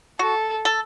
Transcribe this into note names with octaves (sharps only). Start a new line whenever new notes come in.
F#4 A4
A4